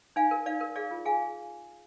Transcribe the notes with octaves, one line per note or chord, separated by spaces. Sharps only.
D#4 F5 G#5
A#4
D#4 D5 F5
A#4
G#4 D5 F5
F4
G#4 F5 G#5